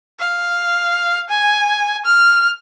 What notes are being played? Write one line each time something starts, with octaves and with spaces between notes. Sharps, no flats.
F5
G#5
F6